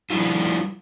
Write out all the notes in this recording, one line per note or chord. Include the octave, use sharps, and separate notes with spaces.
F3 G3 D4 E4 F4